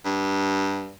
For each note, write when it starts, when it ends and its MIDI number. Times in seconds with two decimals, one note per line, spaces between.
0.05 0.92 43